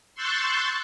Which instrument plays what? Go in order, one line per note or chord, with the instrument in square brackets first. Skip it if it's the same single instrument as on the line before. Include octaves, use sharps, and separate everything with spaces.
[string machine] C6 C#6 E6 F#6 G6 A6